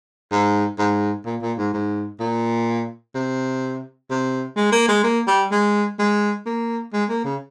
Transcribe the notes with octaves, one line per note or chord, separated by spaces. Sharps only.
G#2
G#2
A#2
A#2
G#2
G#2
A#2
C3
C3
G#3
A#3
G#3
A#3
G3
G#3
G#3
A#3
G#3
A#3
C#3